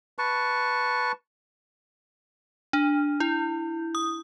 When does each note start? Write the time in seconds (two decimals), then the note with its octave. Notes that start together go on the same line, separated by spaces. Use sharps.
0.18 B4 A5 C#6
2.73 D4
3.20 E4
3.95 D#6